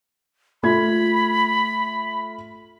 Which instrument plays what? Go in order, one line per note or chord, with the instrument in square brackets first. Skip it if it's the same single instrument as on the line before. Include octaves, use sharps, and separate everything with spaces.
[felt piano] A3 F4 G#6 [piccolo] B5